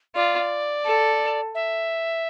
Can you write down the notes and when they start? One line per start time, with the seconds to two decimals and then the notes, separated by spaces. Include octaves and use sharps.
0.15 F4 D5
0.86 A4
1.55 E5